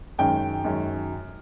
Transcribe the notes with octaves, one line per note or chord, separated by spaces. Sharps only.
F#2 D#3 G#3 C#4 G5
F#2 D#3 G#3 C#4